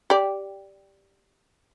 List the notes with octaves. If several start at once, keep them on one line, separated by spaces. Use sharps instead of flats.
G4 D5